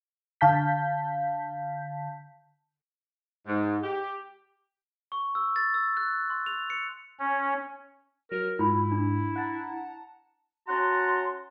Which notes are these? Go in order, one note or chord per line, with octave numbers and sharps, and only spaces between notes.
D3 F5 A5 G6 B6
G#2
G4
C#6
E6
A6
E6
F#6
C6
F7
C#7
C#4
F#3 A#4
G#2 E4 F4 B5
D4
F#5 A5 A#5
C#4 F#4 F#5 A5 A#5 C6